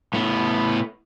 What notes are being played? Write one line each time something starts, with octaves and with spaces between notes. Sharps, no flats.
A2 B3